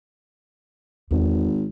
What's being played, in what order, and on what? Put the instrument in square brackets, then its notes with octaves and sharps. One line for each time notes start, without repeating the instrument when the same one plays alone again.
[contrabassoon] G#1 [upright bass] E2